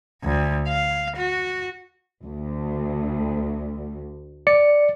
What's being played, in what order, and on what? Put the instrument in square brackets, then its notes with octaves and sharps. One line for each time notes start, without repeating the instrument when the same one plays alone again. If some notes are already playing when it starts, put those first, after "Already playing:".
[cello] D2
F5
F#4
[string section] D2
[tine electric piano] D5 C#7